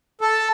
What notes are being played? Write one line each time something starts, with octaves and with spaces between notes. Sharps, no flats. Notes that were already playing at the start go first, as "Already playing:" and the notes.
A4